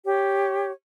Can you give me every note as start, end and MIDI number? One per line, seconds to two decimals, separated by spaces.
0.05 0.70 67
0.05 0.70 73